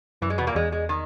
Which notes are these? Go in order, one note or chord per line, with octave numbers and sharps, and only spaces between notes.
F#2 E3
G#3
E2 B2 B3
A#2 A#3
E2 G#3
G#3
D#3